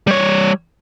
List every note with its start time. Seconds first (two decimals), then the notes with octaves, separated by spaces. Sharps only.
0.07 G3 C#5